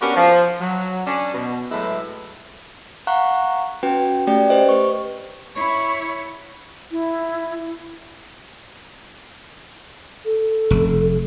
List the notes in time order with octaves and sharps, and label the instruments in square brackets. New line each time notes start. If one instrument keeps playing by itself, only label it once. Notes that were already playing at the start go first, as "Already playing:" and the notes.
[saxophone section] B3 C#4 D4 F#4 G4 A#4
F3
F#3
C#4 D4
B2
A2 F#3 G#3 A3 E4 B4
[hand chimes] F5 F#5 A#5 C#6 F#6
C#4 F#4 B4 G5
A3 C#4 G4 D5 G5
G4 B4 C5 D#5
B4 C#6
[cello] E4 C#5 [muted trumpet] B5 [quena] C#6
[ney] E4
[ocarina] A4
[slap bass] F1